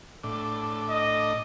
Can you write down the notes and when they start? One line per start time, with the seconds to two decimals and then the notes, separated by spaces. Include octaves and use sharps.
0.24 A2 D4
0.90 D#5